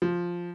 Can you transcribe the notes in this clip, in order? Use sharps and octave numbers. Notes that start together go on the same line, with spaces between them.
F3